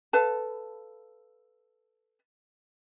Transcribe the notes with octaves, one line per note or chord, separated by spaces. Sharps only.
A4 B4 F5 A5